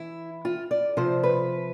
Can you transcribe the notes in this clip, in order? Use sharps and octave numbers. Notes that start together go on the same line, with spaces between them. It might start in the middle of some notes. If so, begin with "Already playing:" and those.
Already playing: E3 E4
F4
D5
C3 F3 C5
B4